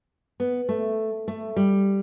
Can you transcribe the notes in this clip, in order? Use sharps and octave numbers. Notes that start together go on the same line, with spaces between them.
B3
A3
A3
G3